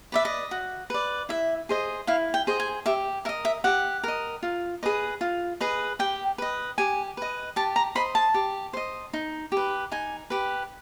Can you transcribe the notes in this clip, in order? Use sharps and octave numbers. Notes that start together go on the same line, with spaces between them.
B4 D5 E5
D#5
F#4
B4 D5
E4 E5
G#4 C5 D#5
E4 F5
G5
G#4 C5 D#5
G#5
G4 E5
A#4 D#5 E5
E5
G4 F#5
A#4 D#5
F4
G#4 B4 D#5
F4
G#4 B4 D#5
G4 G5
B4 D#5
G4 G#5
B4 D#5
G4 A5
A#5
C5 D#5 B5
A5
G4
C5 D#5
D#4
G4 B4
D#4 G#5
G4 B4